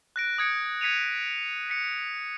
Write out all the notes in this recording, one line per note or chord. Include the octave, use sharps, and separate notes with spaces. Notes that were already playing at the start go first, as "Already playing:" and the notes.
F#6 A#6 D7
D#6 G#6 C#7 D7
G#6 B6 C#7 D#7 F7
B6 C#7